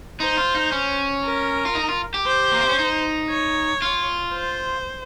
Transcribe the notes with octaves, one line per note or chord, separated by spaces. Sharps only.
D#4 C5
F4
D#4
C#4
A#4
F4
D#4
F4
G4
C5
A#3
C4
C#4
D#4
C#5
F4
C5